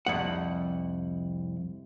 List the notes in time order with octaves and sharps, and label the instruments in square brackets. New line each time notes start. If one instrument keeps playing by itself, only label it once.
[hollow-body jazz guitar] C2 F2 F#5